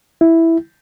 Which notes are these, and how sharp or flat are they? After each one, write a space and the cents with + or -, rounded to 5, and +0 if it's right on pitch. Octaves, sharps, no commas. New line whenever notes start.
E4 +0